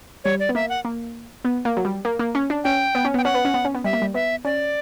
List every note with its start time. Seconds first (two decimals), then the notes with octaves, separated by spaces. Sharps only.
0.24 G3 C#5
0.40 D5
0.49 B3
0.55 A#3 E5
0.69 F#5
0.85 A#3
1.45 B3
1.65 A#3
1.77 F#3
1.85 G3
2.05 A#3
2.19 A#3
2.35 C#4
2.50 D4
2.64 C#4 G5
2.95 B3
3.05 C#4
3.14 B3 G5
3.24 C#4 F#5
3.34 B3
3.45 C#4
3.54 B3
3.65 C#4
3.75 B3
3.84 G3 E5
3.93 A#3
4.02 G3
4.14 B3 E5
4.45 C#4 D5